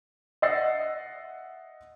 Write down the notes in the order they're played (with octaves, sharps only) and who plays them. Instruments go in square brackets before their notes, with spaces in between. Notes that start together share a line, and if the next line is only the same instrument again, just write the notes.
[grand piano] D#5 E5 F#5 E6 A6 C7